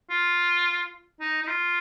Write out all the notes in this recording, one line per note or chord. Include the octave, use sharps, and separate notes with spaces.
F4
D#4
D#4
F4